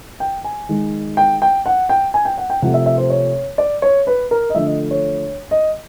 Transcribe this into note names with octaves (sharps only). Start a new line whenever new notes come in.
G5
G#5
D#3 G#3
G5
G5
F#5
G5
G#5
G5
F#5
G5
C3 F3 A3 F#5
E5
E5
C5
C#5
D5
C#5
B4
A#4
D#5
D3 F3 A3 E5
D#5
C#5
D#5